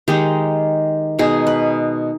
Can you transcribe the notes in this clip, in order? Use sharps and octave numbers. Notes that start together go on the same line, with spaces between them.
D#3 G#3 D#4 G4
B2 G#3 D#4 G#4
B4